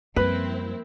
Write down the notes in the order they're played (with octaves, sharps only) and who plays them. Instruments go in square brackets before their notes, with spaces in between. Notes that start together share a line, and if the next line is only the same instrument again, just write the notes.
[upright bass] F#2 G3 [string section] F3 C4 E4 [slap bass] A#3 [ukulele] B4